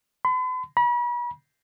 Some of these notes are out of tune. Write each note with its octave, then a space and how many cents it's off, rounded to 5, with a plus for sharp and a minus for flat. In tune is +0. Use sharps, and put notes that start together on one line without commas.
B5 +45
B5 -40